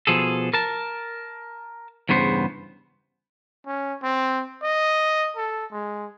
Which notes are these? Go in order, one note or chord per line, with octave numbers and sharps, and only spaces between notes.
B2 F3 G#4 A4
A#4 A5
E2 G2 C#3 B3 C5
C#4
C4
D#5
A4
G#3